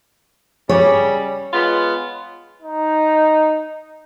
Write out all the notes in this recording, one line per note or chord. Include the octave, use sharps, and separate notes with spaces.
C#3 G3 C#5
G#3 B3 F4
D#4